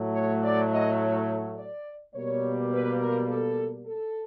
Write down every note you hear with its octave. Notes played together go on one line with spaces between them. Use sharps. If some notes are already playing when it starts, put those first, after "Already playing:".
Already playing: A2 F#3 A3
C#5
D5
D#5
C#5
D5
B2 G3 A#3 C#5
B4
A#4
A4
A4